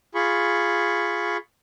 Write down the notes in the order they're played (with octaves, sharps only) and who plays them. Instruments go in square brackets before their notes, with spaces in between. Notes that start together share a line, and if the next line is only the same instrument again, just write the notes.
[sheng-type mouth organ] F4 G#4 B5 C#6